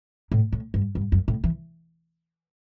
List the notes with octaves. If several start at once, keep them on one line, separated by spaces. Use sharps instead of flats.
A2
A2
G2
G2
F#2
A2
E3